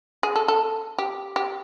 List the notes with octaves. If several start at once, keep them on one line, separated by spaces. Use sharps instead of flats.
G#4
A4
A4
G4
G4